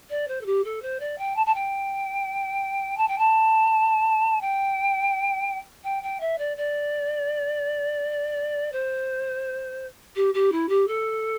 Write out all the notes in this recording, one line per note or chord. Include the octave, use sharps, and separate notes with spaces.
D5
C5
A4
G4
A4
C5
D5
G5
A5
A5
G5
A5
G5
A5
G5
G5
G5
E5
D5
D5
C5
G4
G4
E4
G4
A4